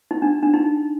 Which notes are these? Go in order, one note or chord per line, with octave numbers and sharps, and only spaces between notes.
D#4
D4
D4
D#4